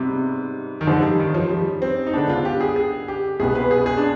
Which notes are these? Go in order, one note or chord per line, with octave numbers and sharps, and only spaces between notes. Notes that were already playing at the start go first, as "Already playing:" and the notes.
Already playing: G#2 C3 G3 B3
D#3
G#2 D3 F3 C4 D#4 G#4
G3
D#3
F3
G3
C4
D#4
D3 G#3 B3 D4
F4
G4
G#4
G#4
G4
C2 B2 B3 G#4
B4
G#4
G#4
D4